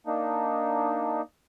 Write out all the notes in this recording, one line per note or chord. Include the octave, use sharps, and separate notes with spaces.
A#3 D4 D#4